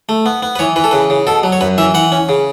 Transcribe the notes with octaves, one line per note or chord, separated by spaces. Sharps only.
A3
B3
B3
B4
E3 C#5
E3 B4
A4
C#3 B4
C#3
B2 A4
F#3
C#5
F#2 B4
E3 E5
E3 F#5
C#4
C#3